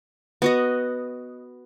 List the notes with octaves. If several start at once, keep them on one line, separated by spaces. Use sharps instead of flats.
B3 F#4 D#5